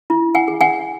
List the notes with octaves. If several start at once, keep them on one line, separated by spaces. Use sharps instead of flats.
E4
F#5 G#5
G#4
F#5 G#5